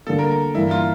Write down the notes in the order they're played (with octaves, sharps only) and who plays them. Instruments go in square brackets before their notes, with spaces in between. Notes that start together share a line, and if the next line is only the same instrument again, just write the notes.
[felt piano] D2 D3 G3 A#3 [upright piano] A4
[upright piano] A#4
A#4
[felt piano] G2 E3 A#3 [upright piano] E4
[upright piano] F4